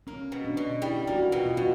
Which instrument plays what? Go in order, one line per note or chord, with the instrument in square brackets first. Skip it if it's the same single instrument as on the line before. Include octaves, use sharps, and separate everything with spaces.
[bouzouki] A#3 [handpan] C#4
[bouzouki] B2
[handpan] D4
[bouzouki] B2
[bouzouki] G3 [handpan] E4
[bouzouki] A#3 [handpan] F#4
[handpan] F4
[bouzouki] B2
[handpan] F4
[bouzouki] B2 [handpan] F#4